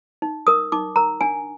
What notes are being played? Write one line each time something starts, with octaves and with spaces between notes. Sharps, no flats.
D#4
A#4 D#6
D#4 D6
A#4 A#5
D4 G#5